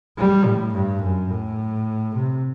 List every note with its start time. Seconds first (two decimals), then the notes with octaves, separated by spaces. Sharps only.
0.18 G3
0.46 A2
0.74 G2
1.02 F#2
1.30 A2
2.15 C3